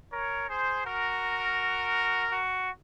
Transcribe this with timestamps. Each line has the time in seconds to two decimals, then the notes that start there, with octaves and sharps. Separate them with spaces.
0.12 A#4 C#5
0.49 G#4 C5
0.85 F#4 A#4
2.31 F#4